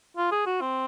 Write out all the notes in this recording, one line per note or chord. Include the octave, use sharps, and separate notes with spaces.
F4
G#4
F#4
C4